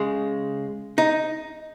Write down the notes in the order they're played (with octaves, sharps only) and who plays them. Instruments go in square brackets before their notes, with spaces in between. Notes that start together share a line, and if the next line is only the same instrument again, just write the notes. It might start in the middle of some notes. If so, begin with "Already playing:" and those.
Already playing: [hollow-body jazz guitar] C#3 G#3
D#4